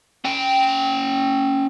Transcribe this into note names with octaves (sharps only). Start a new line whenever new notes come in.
C#4 G5